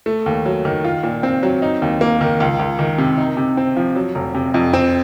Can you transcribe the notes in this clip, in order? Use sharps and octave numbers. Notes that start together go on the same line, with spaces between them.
A3
D#2
F#3
D#3
F4
A#2
C4
F#3
D#4
D#2
A#3
D#3
C#2
C#2
D#3
C3
D#4
C3
C4
F3
F#3
F1
C3
F2
C4